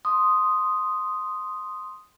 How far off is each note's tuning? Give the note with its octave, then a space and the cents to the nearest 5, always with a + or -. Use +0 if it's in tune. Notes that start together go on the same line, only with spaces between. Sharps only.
C6 +0 D#6 +0